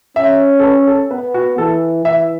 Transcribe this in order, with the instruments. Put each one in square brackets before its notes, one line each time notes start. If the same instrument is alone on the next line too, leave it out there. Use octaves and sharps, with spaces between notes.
[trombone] C#4 [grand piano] E5
[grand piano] A4
B4
A4
[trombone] B3 [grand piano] B4
[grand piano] F#4
[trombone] E3 [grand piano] A4
[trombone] E3 [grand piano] E5